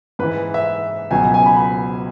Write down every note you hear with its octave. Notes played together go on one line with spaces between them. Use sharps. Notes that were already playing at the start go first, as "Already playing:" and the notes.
G#2 E3 B4
E5
C#2 B2 F#3 G#5
G#5
B5
B5